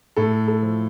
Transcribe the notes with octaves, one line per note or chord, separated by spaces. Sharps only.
A2 A4
A4
F3